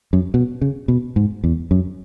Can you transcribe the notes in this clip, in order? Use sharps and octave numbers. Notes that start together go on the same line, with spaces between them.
F#2
B2
C#3
B2
G#2
E2
F#2